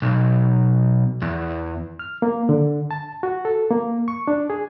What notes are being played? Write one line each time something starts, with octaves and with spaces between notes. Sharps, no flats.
B1
E2
F6
A#3
D3
A5
F#4
A4
A#3
C#6
D4
G#4